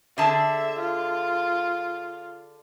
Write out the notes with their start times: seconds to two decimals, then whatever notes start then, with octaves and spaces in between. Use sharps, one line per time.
0.18 D3 G#4 E5 A5
0.79 F4